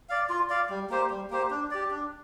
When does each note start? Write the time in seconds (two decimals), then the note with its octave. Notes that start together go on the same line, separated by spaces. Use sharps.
0.09 D5 F5
0.30 F4
0.49 D5 F5
0.70 G3
0.90 A#3 G4 C5
1.10 G3
1.30 A#3 G4 C5
1.51 D4
1.71 G4 D5
1.91 D4